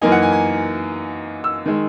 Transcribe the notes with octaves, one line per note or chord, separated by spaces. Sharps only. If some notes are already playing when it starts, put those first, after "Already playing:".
F#2 E3 A#3 D#4 G#5
F#5
G#5
G#5
E6
D#3 G#3